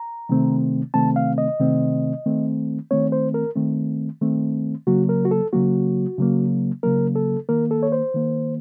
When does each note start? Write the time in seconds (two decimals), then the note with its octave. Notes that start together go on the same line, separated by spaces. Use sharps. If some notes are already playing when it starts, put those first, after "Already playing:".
Already playing: A#5
0.29 C3 D#3 A3 C4
0.94 C3 D#3 A3 C4 A5
1.16 F5
1.38 D#5
1.60 C3 D#3 A3 C4
2.26 D#3 A3 C4
2.91 D#3 A3 C4 C#5
3.12 C5
3.34 A#4
3.56 D#3 A3 C4
4.21 D#3 A3 C4
4.87 C#3 F#3 A#3 F#4
5.09 A#4
5.25 F#4
5.31 A4
5.53 C#3 F#3 A#3 F#4
6.18 C#3 F#3 A#3
6.83 C#3 F#3 A#3 A#4
7.16 A4
7.49 D#3 A#3 A#4
7.71 A4
7.83 C#5
7.92 C5
8.14 D#3 A#3